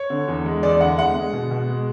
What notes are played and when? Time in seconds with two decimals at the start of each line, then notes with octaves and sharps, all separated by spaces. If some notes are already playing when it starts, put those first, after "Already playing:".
Already playing: C#5
0.10 D3
0.28 E2
0.45 G#3
0.63 E2 D5
0.81 D3 F#5
0.98 G#3 F#5
1.15 G#3
1.33 B2
1.51 B2
1.68 G#3